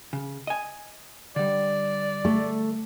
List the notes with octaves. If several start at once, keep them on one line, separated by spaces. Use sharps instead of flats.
C#3
D#5 G#5
D3 G3 D5
A3